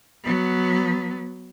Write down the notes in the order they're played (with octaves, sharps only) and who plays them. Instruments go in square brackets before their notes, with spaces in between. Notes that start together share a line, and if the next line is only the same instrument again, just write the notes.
[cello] F#3 B3